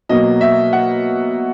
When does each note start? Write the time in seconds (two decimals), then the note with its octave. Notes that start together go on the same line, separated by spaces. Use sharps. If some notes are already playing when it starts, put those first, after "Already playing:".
0.09 B2 F#3 A#3 D#5
0.41 E5
0.73 F#5